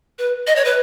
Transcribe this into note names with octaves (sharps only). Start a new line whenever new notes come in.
B4
D#5
C#5
B4